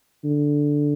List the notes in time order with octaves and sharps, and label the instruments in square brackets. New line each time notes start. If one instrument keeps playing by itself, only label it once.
[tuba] D3